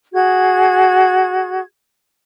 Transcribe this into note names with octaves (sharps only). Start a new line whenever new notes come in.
F#4 G#4 G#6